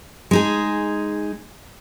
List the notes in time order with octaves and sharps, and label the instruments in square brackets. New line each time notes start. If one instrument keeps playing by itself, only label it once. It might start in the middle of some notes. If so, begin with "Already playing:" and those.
[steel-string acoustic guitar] G#3 D#4 G#4